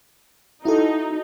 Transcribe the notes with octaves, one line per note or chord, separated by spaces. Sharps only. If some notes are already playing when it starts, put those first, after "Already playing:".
D#4 E4 F#4 A4